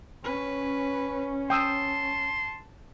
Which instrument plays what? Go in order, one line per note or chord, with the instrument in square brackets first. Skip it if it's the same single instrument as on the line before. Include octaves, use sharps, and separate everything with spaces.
[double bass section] C#4 [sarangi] B4
[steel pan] G5 D#6 E6 [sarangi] A5 [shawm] C6